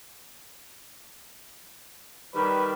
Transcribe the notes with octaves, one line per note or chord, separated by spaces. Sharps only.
D#3 G3 B4